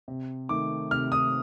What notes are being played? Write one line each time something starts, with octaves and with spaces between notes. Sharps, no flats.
C3
D#3 A3 D6
C3 F6
D#6